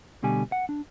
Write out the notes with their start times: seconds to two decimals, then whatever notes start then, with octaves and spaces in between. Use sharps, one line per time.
0.23 D2 B2 D3 G3 G#5
0.52 F#5
0.69 D4